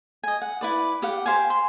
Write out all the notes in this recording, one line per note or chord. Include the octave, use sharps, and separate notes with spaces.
D#5 G#5
F#5
E4 B4 D5
G4 F5 F#5
G4 C5 F5 G#5
C6